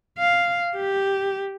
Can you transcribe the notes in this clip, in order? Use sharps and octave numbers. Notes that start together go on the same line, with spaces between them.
F5
G4